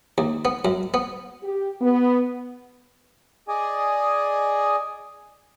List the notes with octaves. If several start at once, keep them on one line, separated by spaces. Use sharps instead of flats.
D#2
B3
F#2
B3
G4
B3
G#4 D5 D#5 G#5